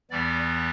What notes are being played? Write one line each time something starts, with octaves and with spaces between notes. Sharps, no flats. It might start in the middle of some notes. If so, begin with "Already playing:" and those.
E2 E3 G3 B3 D5